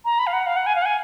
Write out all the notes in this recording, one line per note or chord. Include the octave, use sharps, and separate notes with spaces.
A#5
B5
F5
F#5
F5
F#5
G#5
F5
F#5
G#5